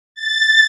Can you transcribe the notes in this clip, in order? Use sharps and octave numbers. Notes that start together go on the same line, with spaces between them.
A6